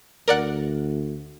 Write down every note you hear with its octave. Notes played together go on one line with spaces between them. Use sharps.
D2 A#4 D5 F#5